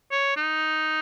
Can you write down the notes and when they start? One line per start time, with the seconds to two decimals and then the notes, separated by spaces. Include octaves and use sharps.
0.12 C#5
0.36 D#4